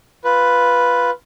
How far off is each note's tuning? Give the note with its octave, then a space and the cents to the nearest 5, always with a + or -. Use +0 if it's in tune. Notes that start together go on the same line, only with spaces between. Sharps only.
F4 +0 B4 +0